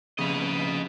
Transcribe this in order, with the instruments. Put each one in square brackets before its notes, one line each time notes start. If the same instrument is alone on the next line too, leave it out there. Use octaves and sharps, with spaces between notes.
[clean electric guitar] F2 C#3 [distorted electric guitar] B4 D#5